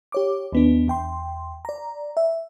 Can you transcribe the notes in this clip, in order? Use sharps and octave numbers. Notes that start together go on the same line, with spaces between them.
G4 C#5 D6
D#2 B3 D4
E2 G5 C6
D5 A#5
E5